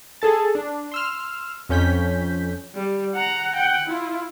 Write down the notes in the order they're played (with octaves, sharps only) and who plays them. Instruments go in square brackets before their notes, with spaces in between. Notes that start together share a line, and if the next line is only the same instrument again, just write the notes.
[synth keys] G#4 A4 A5
D4
C6 E6 F6
F2 C#4 G6 B6
[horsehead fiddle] G3
F#5 A#5
F#5 G5
E4 F4